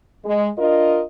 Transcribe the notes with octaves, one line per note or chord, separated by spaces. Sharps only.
G#3
D4 F4 A#4 D#5